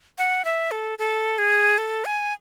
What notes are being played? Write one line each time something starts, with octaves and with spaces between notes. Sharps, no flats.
F#5
E5
A4
A4
G#4
A4
G#5